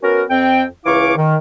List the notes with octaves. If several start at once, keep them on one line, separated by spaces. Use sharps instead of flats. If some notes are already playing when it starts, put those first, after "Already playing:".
B3 C#4 F#4 A#4
F2 C4 G5
C#2 E3 E4 F5 C#6 D6
D#3